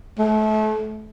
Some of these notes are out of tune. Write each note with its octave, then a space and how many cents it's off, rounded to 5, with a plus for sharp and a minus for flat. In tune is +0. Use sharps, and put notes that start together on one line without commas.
A3 -30